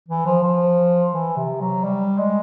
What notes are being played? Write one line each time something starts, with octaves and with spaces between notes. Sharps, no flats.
E3
F3
F3
E3
C3
F#3
G3
G#3